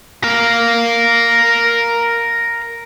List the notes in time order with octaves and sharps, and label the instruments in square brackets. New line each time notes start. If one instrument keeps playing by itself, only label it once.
[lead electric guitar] A#4 F5